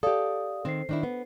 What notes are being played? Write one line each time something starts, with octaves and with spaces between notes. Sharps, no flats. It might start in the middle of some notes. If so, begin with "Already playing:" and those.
G4 A4 D5 F5 D#6
D#3 C4 C5 C7
D#3 D4 E4
B3